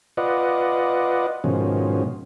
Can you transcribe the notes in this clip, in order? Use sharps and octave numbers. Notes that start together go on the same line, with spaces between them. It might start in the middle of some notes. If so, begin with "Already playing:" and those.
F4 B4 D5 D#5 F#5
G#2 B2 D#3 F3 C#4